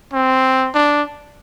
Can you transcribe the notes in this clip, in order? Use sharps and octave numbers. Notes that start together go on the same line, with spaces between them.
C4
D4